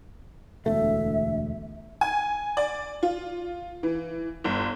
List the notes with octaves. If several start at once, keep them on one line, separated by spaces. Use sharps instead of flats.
E1 D2 A3 E5
G#5
D5
F4
E3
G1